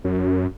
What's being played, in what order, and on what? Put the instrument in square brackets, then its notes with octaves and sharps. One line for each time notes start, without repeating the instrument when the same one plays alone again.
[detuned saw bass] F#2